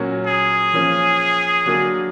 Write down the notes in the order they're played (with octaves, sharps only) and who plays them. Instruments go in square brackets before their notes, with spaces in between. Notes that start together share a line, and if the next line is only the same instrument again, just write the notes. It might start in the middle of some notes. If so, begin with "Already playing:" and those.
Already playing: [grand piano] A#2 F#3 A#3 C#4 F#4
[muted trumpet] G#4
[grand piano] F3 A#3 C#4
D3 F#3 A#3 D4 F#4